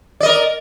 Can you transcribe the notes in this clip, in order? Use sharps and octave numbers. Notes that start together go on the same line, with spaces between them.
A#4 D5 D#5